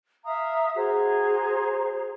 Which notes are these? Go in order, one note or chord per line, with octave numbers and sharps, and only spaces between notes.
E5 F5 A#5 D#6
F#4 G#4 C5 A#5